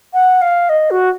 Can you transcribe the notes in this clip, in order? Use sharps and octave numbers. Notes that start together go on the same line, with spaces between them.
F#5
F5
D#5
F#4